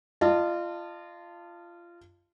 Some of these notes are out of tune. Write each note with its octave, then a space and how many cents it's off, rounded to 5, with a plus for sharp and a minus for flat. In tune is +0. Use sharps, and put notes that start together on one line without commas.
F4 -20 D#5 -45 A5 +15